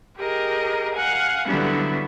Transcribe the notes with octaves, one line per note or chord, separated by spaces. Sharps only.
G4 G#4 A#4 D#5
F5 F#5 G#5
D3 F#3 G3 B3 E4